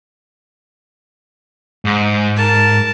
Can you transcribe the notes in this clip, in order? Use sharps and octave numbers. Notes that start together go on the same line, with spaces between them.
G#2
A#4 A5